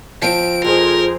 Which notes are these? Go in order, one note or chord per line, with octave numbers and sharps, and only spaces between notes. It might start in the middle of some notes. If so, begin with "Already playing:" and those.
F3 C4 D7
F2 F4 G#4 A#4 C5 C6